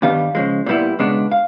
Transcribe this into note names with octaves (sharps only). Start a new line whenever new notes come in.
G2 D#3 G3 B3 F5
C#3 F3 G#3
A#2 G3 B3 E4
C#2 B2 G#3 B3 D4
F5